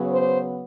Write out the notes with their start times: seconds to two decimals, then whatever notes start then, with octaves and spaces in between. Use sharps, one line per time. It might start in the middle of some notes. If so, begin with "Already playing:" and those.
Already playing: C#3 F#3 B3
0.11 C5